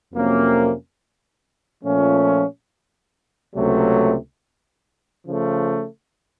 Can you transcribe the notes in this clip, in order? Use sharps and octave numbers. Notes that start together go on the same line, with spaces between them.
F2 C3 F#3 A#3 C#4
A#2 F3 A3 C#4
C#2 C3 F#3 A3
C#3 F3 A3